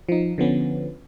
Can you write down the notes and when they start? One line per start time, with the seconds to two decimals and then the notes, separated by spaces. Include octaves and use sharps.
0.09 F3 D#4
0.38 D3 F3 B3 C#4